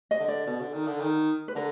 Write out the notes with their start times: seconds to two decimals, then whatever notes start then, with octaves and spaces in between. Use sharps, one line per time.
0.11 D#5
0.19 D3
0.28 D5
0.47 B2
0.61 D3
0.74 D#3
0.87 D3
1.01 D#3
1.48 B4
1.55 D3 A#4